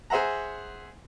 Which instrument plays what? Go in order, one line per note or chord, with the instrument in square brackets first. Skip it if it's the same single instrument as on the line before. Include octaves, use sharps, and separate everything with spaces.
[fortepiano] G#4 C5 E5 F#5 A#5